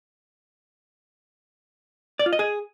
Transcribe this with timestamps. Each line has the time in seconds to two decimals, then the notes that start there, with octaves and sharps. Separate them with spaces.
2.19 D5
2.26 F4
2.33 D#5
2.39 G#4